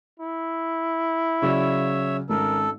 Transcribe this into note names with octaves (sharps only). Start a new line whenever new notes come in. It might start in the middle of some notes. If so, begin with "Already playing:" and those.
E4
C#3 F#3 C#5 D5 E5
G#1 C#4 A4 A#4